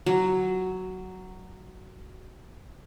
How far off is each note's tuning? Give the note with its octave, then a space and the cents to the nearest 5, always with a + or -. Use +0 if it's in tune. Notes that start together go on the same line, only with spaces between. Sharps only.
F#3 +5